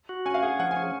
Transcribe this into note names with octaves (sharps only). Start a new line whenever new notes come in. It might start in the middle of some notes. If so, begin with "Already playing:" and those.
F#4
C#4 G#5
F5
G#4 F#5
F3 F#5
G#5
C#4